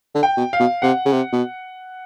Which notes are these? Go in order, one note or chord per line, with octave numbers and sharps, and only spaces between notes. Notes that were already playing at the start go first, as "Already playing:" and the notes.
D3
G5
B2
F5
B2
C3 F#5
C#3
C3
B2